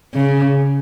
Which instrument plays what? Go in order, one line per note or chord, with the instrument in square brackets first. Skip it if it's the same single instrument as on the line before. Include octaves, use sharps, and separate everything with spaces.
[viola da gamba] C#3